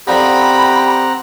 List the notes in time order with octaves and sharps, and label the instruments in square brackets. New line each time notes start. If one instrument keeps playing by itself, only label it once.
[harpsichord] D3 F3 [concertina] C4 F#5 A#5 [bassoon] G4 [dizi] B5